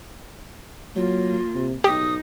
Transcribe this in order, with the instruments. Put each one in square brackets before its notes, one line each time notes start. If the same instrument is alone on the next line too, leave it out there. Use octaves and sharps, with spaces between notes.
[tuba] F#3 [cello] A#3 [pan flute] F4
[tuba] C3
[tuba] B1 [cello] D#4 [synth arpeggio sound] G4 [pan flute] D#6